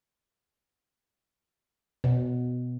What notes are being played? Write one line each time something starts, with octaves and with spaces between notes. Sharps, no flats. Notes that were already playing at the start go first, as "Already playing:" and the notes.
B2